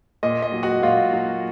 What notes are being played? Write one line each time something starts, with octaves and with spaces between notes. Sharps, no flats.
A#2 D#5
D#5
F#3
F#4 F#5
A#2 F4 F5
F#3